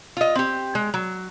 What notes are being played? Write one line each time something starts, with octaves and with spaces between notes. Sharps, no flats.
F4 D#5
C4 G4
G#3
F#3